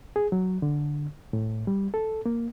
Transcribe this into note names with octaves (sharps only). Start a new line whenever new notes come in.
G#4
F#3
D3
A2
G3
A4
A#3